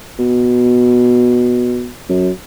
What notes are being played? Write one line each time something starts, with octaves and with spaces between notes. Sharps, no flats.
B2
F#2